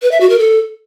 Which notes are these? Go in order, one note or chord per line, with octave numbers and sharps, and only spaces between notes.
B4
E5
F#4
A#4
A4